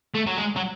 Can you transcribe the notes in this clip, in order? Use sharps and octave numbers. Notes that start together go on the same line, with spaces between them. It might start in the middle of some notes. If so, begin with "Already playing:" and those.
A3
F#3
G#3
F#3